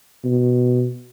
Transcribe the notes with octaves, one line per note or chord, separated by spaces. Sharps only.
B2